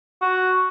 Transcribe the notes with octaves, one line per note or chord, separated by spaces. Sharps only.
F#4